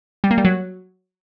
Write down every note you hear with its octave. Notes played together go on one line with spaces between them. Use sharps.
G3
A#3
G3
F#3